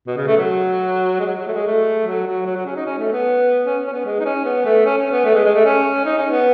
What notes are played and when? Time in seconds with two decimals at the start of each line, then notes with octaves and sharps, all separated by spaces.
0.07 B2
0.17 C#3
0.27 A3
0.37 F#3
1.20 G#3
1.26 F#3
1.40 F#3
1.47 A3
1.53 G#3
1.67 A3
2.07 F#3
2.26 F#3
2.46 F#3
2.56 F#3
2.66 C#4
2.76 D#4
2.86 C#4
2.99 A3
3.12 B3
3.65 C#4
3.87 C#4
3.92 B3
4.06 G#3
4.20 D#4
4.25 C#4
4.45 B3
4.65 A3
4.85 C#4
4.98 C#4
5.11 B3
5.25 A3
5.35 G#3
5.45 G#3
5.55 A3
5.65 C#4
6.05 D#4
6.18 C#4
6.31 B3